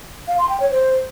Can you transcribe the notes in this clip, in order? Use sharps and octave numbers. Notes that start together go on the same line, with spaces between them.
F5
C6
G5
C#5
C5